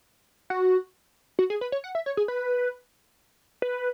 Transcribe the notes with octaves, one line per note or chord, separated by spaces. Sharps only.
F#4
F#4
G#4
B4
C#5
F#5
E5
C#5
G#4
B4
B4